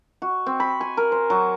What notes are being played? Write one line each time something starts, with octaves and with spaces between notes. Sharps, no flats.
F#4
C4
B5
G#5
A#4
C5
F#3